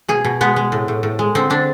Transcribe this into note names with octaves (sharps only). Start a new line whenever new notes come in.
B2 G#4
B2
G#3 B3
G#3
A2
A2
A2
G#3
D3 C4
D3 D4